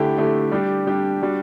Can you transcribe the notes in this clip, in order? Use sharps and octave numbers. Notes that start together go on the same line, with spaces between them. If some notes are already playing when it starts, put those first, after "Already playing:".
Already playing: D3 A3 E4 G4
D3 A3 E4 G4
G3 D4 G4
G3 D4 G4
G3 D4 F#4